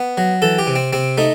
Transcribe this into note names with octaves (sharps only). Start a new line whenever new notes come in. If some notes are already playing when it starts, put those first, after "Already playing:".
Already playing: B3
F#3
E3 A4
G4
C3
C4
C3 C4
A3 D#4